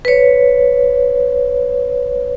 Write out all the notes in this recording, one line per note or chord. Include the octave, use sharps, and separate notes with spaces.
B4 C#5